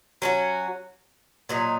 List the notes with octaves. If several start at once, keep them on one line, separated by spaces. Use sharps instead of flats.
F#3 C#4 F#4
A#2 F#3 D#4